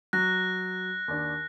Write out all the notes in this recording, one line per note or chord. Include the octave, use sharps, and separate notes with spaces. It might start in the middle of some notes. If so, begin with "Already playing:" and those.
F#3 F#6 A#6
D#2 D4